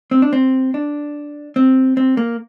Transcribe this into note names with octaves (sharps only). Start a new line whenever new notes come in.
C4
D4
C4
D4
C4
C4
A#3